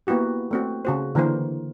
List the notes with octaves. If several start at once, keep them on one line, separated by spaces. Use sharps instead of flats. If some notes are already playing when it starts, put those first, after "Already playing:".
A#3 B3 E4 F#4 G4
A3 C4 F#4
C#3 F#4 C5
D3 E3 A#3 A#4 C5